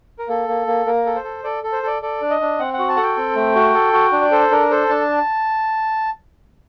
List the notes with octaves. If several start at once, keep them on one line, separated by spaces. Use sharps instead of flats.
A#4
A#3 A4
A#3
A#3
A#3 A#4
A4
C5
A4
A4 D5
A4
C5
A4 D5
A4 D5
D4
D#5
D4
C4 F#5
F#5
F#4
A5
A4 F#5
G5
C4
A3
F#4
A4
F#4
D4
D5
A4 C5
D4 A#4
A4 C5
D4 A5